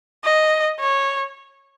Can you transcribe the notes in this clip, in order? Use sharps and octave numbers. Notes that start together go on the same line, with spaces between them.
D#5
C#5